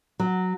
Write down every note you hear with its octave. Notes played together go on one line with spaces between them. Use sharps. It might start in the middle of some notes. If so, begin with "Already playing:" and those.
F#3